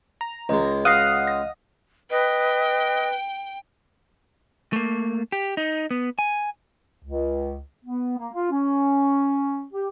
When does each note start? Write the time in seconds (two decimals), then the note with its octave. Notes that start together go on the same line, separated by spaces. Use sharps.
0.21 A#5
0.49 C#2 G#3 D#5
0.85 D#5 F5 F#5 D#6 F#6 C7
1.27 A#6
2.11 B4 D#5 G5
4.73 A3 A#3
5.32 G4
5.57 D#4
5.91 B3
6.19 G#5
7.02 C#2
7.85 B3
8.17 A#3
8.33 F4
8.51 C#4
9.73 G4